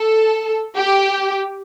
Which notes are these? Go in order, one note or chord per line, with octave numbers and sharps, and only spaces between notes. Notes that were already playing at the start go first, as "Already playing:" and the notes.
Already playing: A4
G4